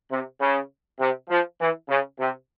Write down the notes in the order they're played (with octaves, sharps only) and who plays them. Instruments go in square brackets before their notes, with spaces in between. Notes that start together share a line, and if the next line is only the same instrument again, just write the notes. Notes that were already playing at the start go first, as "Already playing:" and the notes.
[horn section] C3
C#3
C3
F3
E3
C#3
C3